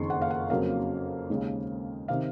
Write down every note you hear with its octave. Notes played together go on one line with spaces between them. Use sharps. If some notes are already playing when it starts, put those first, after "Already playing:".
Already playing: F#1 F2 D#3 A#3 C6 C#6
F#5
F5
F#5
F2 C#3 F#3 A#3 F5
D#2 C#3 G#3
C3 D#3 F5